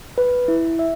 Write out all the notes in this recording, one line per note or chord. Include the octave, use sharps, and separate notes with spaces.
B4
E4
E5